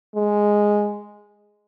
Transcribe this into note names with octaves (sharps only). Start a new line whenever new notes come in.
G#3